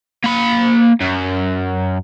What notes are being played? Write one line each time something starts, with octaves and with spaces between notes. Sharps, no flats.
A#3 B5
F#2